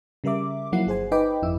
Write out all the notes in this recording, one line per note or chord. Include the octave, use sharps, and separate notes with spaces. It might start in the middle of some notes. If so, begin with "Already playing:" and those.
C#3 G3 A#4 E5 D6
F3 F#3 A#3 E4 F#5 C7
G1 G#4 C5 G#5
D#4 B4 D#5 G5 B5 D6
G1 F2 E4 E6